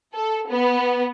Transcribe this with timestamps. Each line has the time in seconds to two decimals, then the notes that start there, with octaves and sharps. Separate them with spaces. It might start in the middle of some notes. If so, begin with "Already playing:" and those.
0.14 A4
0.50 B3